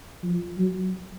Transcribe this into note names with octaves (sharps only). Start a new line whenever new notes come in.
F3
F#3